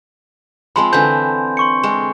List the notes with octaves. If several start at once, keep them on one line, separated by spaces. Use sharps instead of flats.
F3 G#3 C4 B5 C6
D3 E3 C4 G#5 G6
C6 C#6 C#7
G#3 C4